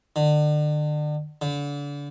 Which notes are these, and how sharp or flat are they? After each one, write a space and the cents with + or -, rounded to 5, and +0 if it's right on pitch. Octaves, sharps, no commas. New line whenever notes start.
D3 +35
D3 -35